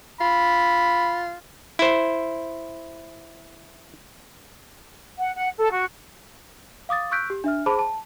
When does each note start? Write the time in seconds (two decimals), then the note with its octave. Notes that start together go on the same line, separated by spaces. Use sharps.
0.21 F4 B5
1.79 E4 C5
5.18 F#5
5.36 F#5
5.57 A4
5.71 F#4
6.89 F5 D6 D#6 A6
7.11 C#6 E6 F#6 G6 B6 D7
7.30 G4
7.44 D4 E5 F6
7.66 G#4 C5 A5 B5 D6
7.79 A5